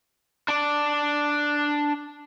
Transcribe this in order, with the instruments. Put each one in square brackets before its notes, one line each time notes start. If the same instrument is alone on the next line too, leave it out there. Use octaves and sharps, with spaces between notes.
[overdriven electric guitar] D4 D5